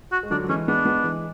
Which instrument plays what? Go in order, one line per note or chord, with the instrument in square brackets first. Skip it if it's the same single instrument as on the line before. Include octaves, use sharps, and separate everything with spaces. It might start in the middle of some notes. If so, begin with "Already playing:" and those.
[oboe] F#4
[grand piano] G#3
[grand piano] D3 F#3 [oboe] D4
[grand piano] F#3
[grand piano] E3 G#3 [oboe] C#4
[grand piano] G#3 B3 [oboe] D4
[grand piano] G#3 B3
E3 G#3